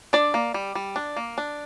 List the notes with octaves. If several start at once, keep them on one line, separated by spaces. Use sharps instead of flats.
D4 D5
A#3
G3
G3
D4
A#3
D4